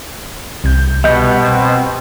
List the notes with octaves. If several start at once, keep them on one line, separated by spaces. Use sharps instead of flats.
C2 G6
B2 G3 B3 D#5 G6
C4